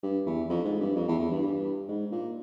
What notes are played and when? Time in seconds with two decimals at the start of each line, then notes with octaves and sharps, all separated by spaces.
0.03 G2
0.26 E2
0.50 F2
0.65 G#2
0.80 G2
0.95 F2
1.08 E2
1.19 E2
1.31 G2
1.42 G2
1.88 G#2
2.12 A#2